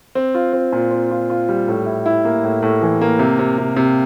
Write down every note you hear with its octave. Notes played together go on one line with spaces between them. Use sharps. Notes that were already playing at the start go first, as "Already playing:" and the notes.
C4
F4
C4
A#2
C4
F4
F4
G3
A2
E4
E4
A#3
A2
A2
E3
A#3
C3
C3
C3
C3